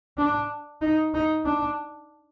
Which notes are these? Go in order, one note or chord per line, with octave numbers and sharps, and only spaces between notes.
D4
D#4
D#4
D4